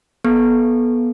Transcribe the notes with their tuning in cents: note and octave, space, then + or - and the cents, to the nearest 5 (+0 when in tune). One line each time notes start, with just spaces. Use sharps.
B3 -25 A4 -30